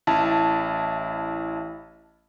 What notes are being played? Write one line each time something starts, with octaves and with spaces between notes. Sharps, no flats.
A1 E4 A5